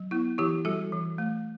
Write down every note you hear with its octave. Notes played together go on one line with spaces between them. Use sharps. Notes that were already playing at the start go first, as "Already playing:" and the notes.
Already playing: F#3
B3 E4
E3 E4 G4
G3 F#4 A4
E3
A3